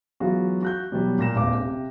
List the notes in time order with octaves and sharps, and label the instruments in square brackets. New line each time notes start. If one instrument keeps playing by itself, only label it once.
[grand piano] E3 F#3 G#3 B3 F4 F#4
F#4 F#6 G6
B2 E3 F#3 G3
A#2 A#3 A#6 E7
D#1 A1 E2 F5 D6
C3